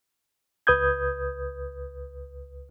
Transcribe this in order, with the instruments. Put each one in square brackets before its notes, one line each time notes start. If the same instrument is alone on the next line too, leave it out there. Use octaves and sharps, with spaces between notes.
[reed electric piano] C#2 B4 D#6 G6 G#6